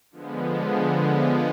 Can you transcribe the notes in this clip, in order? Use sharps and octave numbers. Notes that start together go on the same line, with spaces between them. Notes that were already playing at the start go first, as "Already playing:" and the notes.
D3 F3 G#3 B3